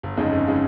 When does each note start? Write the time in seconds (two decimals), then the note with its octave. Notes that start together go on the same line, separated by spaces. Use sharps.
0.03 G1
0.17 F2 C#3 G#3 D#4
0.32 G1
0.47 C#3 G#3 D#4